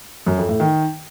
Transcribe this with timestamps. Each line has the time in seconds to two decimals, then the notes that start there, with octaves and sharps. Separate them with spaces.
0.26 F#2
0.38 F2
0.49 A2
0.60 D#3